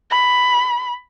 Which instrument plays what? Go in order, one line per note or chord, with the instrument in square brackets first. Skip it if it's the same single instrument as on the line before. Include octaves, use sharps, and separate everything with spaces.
[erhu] B5